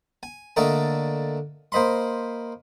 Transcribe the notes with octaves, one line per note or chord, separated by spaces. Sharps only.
G#5
D3 A3 A#3 D5 D#5 A#5
A#3 C5 D#5 B5 C6